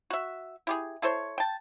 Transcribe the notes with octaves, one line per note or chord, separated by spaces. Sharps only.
F#4 E5
E4 G4 G#4
E4 A4 C5 C#5
G5 A5